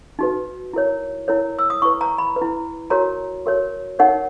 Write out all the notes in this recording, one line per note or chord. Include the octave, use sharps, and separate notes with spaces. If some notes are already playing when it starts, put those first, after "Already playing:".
D#4 F#4 B4
E4 A#4 C#5
E4 A#4 C#5
E6
D#6
E4 B4 C#6
A#5
B5
B4
E4
F#4 A#4 C#5 A#5
F#4 A#4 C#5
D#4 A#4 C#5 F#5